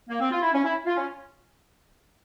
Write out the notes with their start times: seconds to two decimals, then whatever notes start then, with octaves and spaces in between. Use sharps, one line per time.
0.09 A#3
0.20 C4
0.30 F4
0.42 E4
0.52 C#4
0.63 E4
0.85 F4
0.96 C#4